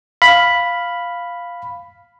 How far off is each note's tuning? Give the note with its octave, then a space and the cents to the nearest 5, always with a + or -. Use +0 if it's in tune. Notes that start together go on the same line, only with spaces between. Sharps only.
F5 +0 B5 +0